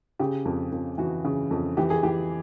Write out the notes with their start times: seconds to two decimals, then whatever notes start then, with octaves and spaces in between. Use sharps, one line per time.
0.19 C#3 G4
0.45 F2
0.72 F2
0.98 E3 F#4
1.25 C#3
1.51 F2
1.77 E3 G4
1.90 G#4
2.03 E3 G4